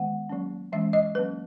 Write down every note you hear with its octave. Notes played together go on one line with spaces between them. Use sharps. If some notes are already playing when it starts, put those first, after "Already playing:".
Already playing: D#3 G#3 B3 F#5
F#3 A#3 C#4
E3 G#3 C#4 E5
D#5
F#3 A#3 C#4 B4